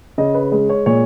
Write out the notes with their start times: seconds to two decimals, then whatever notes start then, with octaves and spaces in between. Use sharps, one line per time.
0.18 C#3 D#5
0.35 B4
0.52 G#3
0.70 C#5
0.86 A#2 C#5